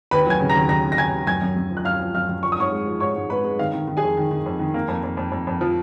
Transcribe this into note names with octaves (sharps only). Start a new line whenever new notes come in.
D#2 B4 B5
F#3 G#5 G#6
C#3
A#5 A#6
D#2
D#2 A#5 A#6
D#2
A#6
D#2 G#5 G#6
D#2
F#2 G#5 G#6
F#2
F#2
F3
F#6
F#2 F5 F6
F3
F#2 F5 F6
F#2
F3 C#6
D#6
G#2 C#5 C#6
G#3
F3
G#2 C#5 C#6
G#2
G#2 B4 B5
G#3
D#3 F5
D#3
D#3
G#4 G#5
F2
D#3
D#3
F2
D#3
A#3
F2
F2
F2
F2
F2
F3